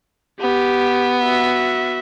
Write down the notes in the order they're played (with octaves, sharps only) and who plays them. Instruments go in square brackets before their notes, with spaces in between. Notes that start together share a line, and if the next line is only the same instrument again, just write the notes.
[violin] B3 [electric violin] G4
[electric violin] F#4 E5